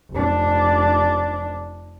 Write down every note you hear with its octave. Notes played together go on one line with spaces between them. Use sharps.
F1 D4